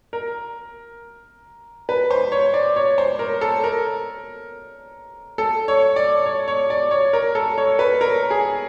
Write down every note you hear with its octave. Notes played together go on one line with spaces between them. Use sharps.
A#4
B4
C5
C#5
D5
C#5
C5
A#4
A4
A#4
A4
C#5
D5
C#5
C#5
D5
C#5
A#4
A4
C#5
B4
A#4
G#4